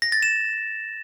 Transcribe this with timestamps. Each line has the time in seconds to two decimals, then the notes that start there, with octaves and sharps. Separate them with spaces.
0.02 A#6
0.12 A6
0.23 E7